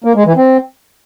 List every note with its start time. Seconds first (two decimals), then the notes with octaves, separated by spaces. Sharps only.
0.04 A#3
0.15 G#3
0.26 E3
0.37 C4